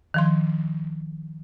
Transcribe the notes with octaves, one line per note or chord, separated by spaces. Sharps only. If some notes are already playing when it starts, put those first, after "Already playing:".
D#3 F3 C6